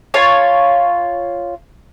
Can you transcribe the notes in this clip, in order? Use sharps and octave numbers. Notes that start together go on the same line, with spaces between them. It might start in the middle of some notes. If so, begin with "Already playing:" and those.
F4 C#5 A5